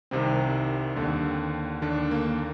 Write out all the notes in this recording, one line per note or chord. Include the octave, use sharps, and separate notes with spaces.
C2 C3 D#3 C4
D#2 D3
D#2 D3 D4
A#3